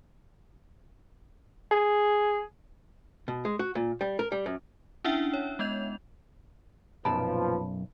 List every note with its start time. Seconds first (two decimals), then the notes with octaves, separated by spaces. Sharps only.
1.71 G#4
3.28 B2
3.45 G#3
3.59 F#4
3.75 A#2
4.01 G3
4.19 A#4
4.32 G3
4.46 F#2
5.04 C#4 D4 E4 E5 F#5 G5
5.34 C#5
5.59 G#3 B3 D#5 G6 F7
7.05 B1 F#2 A#2 F3 B4 A5 B5